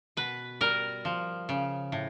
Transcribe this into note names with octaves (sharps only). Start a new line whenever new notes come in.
B2 B4
G3 A#4
F3
C#3
A2